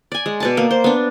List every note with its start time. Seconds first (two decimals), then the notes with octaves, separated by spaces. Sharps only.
0.12 D5 G#5
0.26 G#3
0.40 B2 D5 A5
0.57 A#3
0.71 C5
0.84 B3 D4